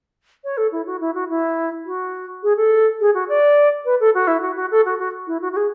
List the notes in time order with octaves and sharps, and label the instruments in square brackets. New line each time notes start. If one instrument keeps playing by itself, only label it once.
[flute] C#5
A4
E4
F#4
E4
F#4
E4
F#4
G#4
A4
G#4
F#4
D5
B4
A4
F#4
E4
F#4
F#4
A4
F#4
F#4
E4
F#4
F#4
G#4